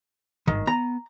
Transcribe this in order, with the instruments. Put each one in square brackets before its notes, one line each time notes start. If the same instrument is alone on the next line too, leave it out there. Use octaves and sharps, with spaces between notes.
[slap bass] G#1 G2 [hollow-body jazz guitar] D#3
[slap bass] B3 [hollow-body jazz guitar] A#5